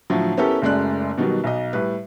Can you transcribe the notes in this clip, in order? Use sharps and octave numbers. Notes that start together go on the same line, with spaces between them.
A2 D3 F3 F#3
B3 C#4 E4 G4 A4 A#4
F#1 F#2 G#3 A3 D5 F#6
B2 D#3 F#3 G3
B1 D#5
A2 G3 B4